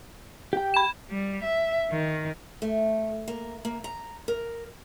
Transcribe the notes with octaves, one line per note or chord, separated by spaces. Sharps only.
G4 G5
B5 E7
G3
E5
D#3
A3
A#3
A#3
A#5
A#4